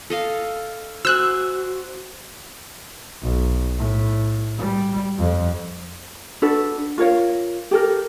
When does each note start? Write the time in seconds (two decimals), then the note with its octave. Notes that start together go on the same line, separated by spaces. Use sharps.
0.10 A4 D#5 F5
1.05 F#4 C5 G#5 E6 F#6
3.22 B1
3.78 A2
4.58 G3
5.18 F2
6.42 D4 F#4 A4 B4
6.98 F4 A#4 C#5 F5
7.71 G4 A4 A#4